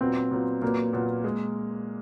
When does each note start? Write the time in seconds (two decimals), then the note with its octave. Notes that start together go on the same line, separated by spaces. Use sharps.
0.01 A#2 F#3 B3 C4
0.31 A#2 F#3 B3
0.62 A#2 F#3 A#3 B3
0.93 A#2 F#3 B3
1.24 G#3